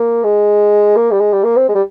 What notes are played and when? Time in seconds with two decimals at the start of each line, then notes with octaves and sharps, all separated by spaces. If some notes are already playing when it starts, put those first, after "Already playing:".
Already playing: A#3
0.24 G#3
0.96 A#3
1.11 G3
1.20 G#3
1.33 G3
1.44 A#3
1.57 C4
1.69 G#3
1.75 G3